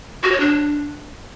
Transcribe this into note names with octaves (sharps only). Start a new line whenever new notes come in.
F#4
C#5
D4